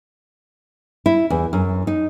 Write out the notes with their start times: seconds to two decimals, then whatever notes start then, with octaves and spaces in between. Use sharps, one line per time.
1.06 E4
1.30 E2
1.53 F#2
1.87 D#4